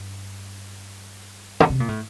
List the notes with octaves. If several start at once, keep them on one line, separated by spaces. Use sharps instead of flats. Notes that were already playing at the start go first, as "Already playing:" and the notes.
Already playing: G2
D3
C3
A#2
A2